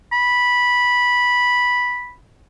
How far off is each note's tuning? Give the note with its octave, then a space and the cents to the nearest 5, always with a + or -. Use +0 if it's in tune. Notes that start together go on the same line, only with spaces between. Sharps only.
B5 -10